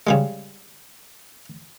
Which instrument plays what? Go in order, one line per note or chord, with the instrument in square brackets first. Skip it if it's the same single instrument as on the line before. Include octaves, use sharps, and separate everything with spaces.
[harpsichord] C#3 G3 G#3